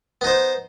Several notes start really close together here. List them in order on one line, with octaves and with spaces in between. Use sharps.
B3 D#4 C5